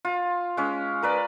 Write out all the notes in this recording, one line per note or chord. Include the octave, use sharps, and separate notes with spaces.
F4
G#3 C#4
A#4 B4 D5